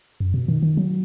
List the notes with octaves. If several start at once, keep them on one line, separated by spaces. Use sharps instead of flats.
F#2
B2
D#3
D#3
F#3